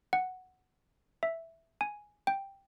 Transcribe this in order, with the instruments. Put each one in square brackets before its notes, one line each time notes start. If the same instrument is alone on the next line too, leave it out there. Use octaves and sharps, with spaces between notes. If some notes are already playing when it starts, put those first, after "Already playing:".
[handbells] F#5
E5
G#5
G5